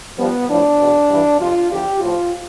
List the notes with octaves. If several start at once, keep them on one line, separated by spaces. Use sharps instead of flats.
G2 F3 B3
A2 F3 D4
E2 B2
G2 E3
F2 C3 F3 F4
E2 D3 F3 G4
A2 F3 F4